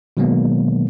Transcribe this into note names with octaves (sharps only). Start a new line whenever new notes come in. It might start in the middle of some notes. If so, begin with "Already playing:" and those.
B2 D#3 F#3 G#3 A#3 B3